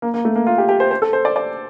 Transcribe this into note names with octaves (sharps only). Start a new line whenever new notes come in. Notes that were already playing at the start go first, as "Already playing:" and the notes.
A#3
A#3
A3
A#3
F4
G4
G4
C5
C5
A4
C5
D5
D5